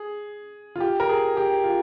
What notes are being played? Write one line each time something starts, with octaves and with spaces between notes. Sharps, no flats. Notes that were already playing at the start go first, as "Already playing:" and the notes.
Already playing: G#4
F4
G4
A#4
G#4
G4
F4